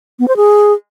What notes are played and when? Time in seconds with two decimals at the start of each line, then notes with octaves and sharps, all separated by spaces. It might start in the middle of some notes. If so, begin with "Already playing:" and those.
0.19 B3
0.28 C5
0.36 G#4